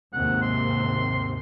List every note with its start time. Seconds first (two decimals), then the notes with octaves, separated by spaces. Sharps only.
0.13 D#2 G#2 C3 F#5
0.42 C6